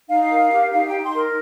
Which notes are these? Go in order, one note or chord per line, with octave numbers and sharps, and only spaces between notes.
D#4 F5
A#4
G4
D#4 F5
G5
D#4
C6
A#4